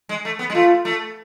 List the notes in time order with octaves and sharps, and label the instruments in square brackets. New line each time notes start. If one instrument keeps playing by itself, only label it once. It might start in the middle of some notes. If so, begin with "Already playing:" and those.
[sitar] G#3
A3
B3
G#3
[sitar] A3 [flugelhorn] F4
[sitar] A3